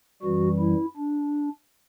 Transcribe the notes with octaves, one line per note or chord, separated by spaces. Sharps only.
F#2 E3 G3 F#4
E4
D4